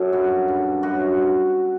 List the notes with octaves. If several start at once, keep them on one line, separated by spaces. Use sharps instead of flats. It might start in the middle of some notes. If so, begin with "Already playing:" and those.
Already playing: F#2 B2 A4
G2 F#4
G2
F#2 F#4